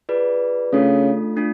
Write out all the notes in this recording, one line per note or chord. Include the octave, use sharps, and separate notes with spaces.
F4 G#4 B4 D5
C#3 A3 D4 F4 A4
A3 D4 F4